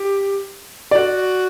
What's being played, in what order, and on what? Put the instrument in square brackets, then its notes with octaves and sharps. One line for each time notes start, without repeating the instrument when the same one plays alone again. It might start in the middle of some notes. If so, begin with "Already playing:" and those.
Already playing: [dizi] G4
[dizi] F#4 [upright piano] D5